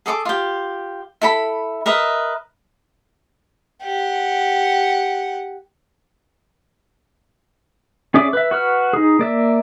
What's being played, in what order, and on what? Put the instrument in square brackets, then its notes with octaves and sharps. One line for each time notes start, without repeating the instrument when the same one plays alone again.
[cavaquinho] G#4 A4 C#6 D6
F4 G4
E4 A4 B5
A#4 B4 D#5 E5
[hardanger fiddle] G4 F#5
[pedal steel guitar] C#4 G#4 D5 E5 D6
B4 E5
F#4 B4 F6
D#4 G#4
A#3 D5 E5